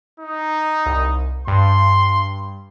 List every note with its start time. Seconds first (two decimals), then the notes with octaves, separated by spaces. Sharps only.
0.20 D#4
0.86 C2
1.48 G2 C6